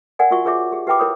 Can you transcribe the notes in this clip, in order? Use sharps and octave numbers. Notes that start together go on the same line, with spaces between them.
A#4 D5 F#5 G#5
F4 F#4 A#4 E5 C#6
F4 G#4 A#4 C#5 E5 D6
G4 G#4
G4 B4 E5 G5 B5 D6
E4 A#4 C#5 B5 D#6